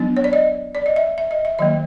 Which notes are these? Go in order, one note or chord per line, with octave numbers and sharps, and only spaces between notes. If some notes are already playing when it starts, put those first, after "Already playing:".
Already playing: F#3 B3 D4
C#5
D5
D#5
D5
D#5
E5
E5
D#5
E5
D#3 F#3 A#3 D#5